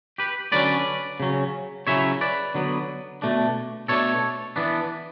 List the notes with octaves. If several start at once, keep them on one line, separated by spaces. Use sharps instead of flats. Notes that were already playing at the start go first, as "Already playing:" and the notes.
G4 B4
D3 F#3 C#4 B4 D5
C#3 F#3 C#4
C#3 F#3 C#4 E4 C#5 E5
B4 D5
D3 F#3 B3
B2 A3 D4
B2 A3 D4 A4 C#5
E3 B3 D4